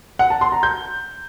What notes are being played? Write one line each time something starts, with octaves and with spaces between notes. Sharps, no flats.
F#5
A5
C6
A#5
G6